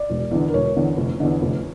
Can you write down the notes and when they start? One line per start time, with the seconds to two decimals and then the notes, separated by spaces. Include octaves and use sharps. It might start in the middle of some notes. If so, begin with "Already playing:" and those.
Already playing: D5
0.10 E1
0.31 E2 D3
0.48 A#4
0.54 E1 C#5
0.76 E2 D3
0.97 F1
1.20 E2 D3
1.42 F1